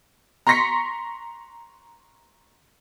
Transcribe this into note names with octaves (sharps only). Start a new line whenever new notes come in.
A#5 C6 C#6 A#6 B6 C#7